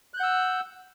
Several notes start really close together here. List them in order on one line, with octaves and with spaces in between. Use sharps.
F#6 G6 F#5 E6